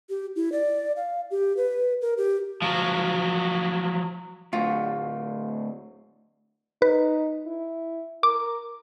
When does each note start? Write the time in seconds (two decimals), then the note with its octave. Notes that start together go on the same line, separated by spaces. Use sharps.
0.10 G4
0.36 E4
0.52 D5
0.96 F5
1.31 G4
1.57 B4
2.01 A#4
2.17 G4
2.62 F3 F#3
4.53 D2 A2 F4
6.82 D#4 B4
7.46 E4
8.23 A#4 D6